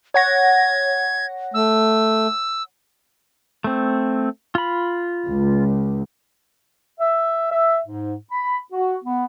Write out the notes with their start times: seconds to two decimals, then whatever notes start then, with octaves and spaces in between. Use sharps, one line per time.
0.14 C#5 F#5 G#6 A#6
1.54 A3 E6
3.64 A3 C4
4.55 F4 B5
5.26 C#2
7.00 E5
7.51 E5
7.86 G#2
8.32 B5
8.73 F#4
9.05 B3